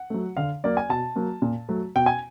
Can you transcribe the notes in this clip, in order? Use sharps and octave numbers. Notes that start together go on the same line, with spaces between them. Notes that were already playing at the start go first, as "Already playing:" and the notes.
Already playing: F#5
F#3 A3
D3 F5
F#3 A#3 D5
G#5
B2 A5
F#3 A#3
A#2
F#3 A3
B2 G5
G#5